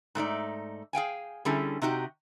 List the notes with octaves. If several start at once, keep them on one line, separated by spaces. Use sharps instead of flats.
G#2 A3 D#4 D5
G#4 F5 G5 G#5
D3 G3 C#4 E4 G#4 A4
C3 D#4 F#4 G4